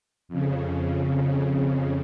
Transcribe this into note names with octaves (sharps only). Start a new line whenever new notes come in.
F2 C#3